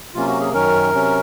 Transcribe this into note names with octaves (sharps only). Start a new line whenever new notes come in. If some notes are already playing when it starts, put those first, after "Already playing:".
C3 F#3 A#3 C#4 F4
F#4
G#4
F#2 D#3 F#3 C#4 A#4
C3 F#3 C#4